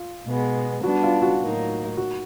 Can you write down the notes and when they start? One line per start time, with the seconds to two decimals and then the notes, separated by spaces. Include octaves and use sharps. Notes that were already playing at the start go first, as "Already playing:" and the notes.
Already playing: F4
0.27 B2 G#3 B3
0.83 G3 B3 D4 F#4
1.03 F4
1.22 F#4
1.41 A2 F#3 A#3 D#4
1.97 F#4